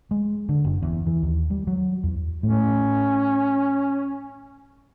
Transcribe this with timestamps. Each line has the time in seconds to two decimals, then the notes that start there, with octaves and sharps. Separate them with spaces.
0.11 G#3
0.49 D3
0.64 F#1
0.82 E2
1.07 E3
1.23 D#2
1.50 G3
1.67 F#3
2.04 E2
2.43 A2 C#4